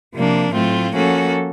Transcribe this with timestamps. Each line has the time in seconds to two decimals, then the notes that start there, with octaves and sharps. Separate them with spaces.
0.14 C3 F3 A#3 D4
0.53 A2 F#3 A3 C4 F4
0.92 F3 A#3 C#4 F#4 A4